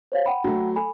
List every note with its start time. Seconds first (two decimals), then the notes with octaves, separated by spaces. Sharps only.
0.12 C5 C#5 F5
0.26 F#5 G5 B5
0.44 F#3 A3
0.76 A4 G#5 B5